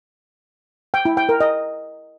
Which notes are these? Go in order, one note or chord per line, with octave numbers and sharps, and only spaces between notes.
G5
E4
G5
A#4
D#5